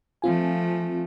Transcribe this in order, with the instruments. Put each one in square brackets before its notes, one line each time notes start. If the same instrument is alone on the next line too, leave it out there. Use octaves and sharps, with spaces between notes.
[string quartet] F3 A3 [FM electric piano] C4 F4 G#5